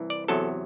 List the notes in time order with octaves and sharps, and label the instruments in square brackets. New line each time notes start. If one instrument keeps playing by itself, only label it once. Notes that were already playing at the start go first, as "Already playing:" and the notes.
Already playing: [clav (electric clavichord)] C2 E3
D5
E2 C3 F#3 A4